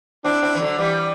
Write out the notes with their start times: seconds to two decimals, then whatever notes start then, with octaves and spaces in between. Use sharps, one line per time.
0.24 C4 D4 E4
0.43 C4 E4
0.55 E3
0.60 D3 F#3
0.78 E3 G3